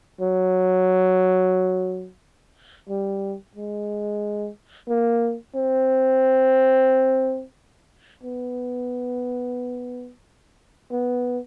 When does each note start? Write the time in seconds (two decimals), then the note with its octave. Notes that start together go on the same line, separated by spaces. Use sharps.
0.21 F#3
2.89 G3
3.55 G#3
4.89 A#3
5.56 C4
8.23 B3
10.92 B3